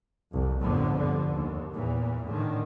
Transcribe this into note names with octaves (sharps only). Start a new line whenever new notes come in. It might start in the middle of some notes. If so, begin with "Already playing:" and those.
C2 F2
G1 F2 A2 D3 F3 B3
G2 D3
D#2
E2 A#2 E3
A2 D3 D#3